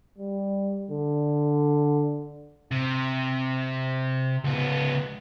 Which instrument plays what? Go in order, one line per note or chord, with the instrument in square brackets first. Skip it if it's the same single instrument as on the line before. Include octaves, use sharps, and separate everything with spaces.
[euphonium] G3
D3
[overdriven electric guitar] C3
C#2 B3